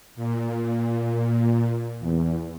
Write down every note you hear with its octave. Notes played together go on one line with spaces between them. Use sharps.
A#2
E2